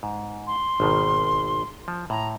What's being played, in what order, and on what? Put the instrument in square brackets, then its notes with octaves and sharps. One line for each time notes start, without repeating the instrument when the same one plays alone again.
[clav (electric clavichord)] G#2
[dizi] C6
[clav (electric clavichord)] G#1 B2 D#3
F3
[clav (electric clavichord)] A2 [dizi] A#5